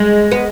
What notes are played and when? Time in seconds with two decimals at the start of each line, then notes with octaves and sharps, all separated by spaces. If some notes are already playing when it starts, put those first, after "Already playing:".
Already playing: G#3
0.31 B3